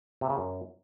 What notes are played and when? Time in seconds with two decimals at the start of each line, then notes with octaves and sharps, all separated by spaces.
0.21 C3
0.30 C#3
0.38 F#2